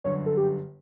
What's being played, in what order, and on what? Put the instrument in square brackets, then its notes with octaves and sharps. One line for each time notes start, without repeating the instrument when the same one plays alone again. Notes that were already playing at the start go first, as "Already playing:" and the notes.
[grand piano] G1 F#2 D3 [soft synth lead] C#5
[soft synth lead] A4
G4